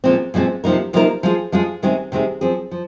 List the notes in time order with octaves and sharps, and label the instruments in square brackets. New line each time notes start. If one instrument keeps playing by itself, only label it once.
[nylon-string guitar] A#2 F3 G#3 C4
A#2 F3 G#3 C4
C3 F3 A#3 D#4 A#4
C3 F3 A#3 D#4 A#4
F3 G#3 F4 G#4
F3 G#3 F4 G#4
C3 D#3 G#3 C4 G#4
C3 D#3 G#3 C4 G#4
F3 C4 G#4
F3